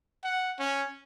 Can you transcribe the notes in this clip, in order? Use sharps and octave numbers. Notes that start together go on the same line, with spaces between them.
F#5
C#4